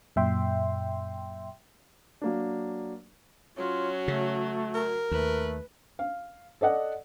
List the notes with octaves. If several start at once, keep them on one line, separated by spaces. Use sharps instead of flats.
F#2 A#2 E5 G5 C6
F#3 A#3 D4
F#3 C#4 F4
C#3 A3
A#4
D#2 A3 B4
F5
A4 D5 D#5 F#5